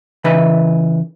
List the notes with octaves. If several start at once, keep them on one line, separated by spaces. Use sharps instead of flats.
C#3 E3 D#4 B4 E5 B5